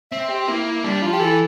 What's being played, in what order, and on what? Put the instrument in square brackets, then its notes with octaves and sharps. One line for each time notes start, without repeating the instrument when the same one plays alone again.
[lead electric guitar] C4 [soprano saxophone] E5
[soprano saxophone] G4
[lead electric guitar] A#3 [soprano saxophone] E4
[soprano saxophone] E4
[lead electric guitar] G3 [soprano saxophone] D4
[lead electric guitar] F3 [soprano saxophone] F4
[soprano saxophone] G4
[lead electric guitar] E3 [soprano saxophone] A4